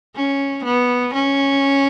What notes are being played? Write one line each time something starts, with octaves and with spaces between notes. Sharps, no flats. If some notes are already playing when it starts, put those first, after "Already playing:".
C#4
B3
C#4